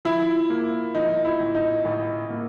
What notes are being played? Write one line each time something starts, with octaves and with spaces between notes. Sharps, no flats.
F3 E4
A#3
F3 D#4
E4
A1
D#4
A1
A#3